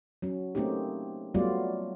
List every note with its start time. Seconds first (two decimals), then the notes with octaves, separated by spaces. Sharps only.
0.22 F#3 C#4
0.55 A3 A#3 C4 C#4 D#4 G4
1.35 F#3 G3 A3 B3 F4 D5